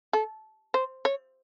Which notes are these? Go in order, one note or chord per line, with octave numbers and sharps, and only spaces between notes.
A4
C5
C#5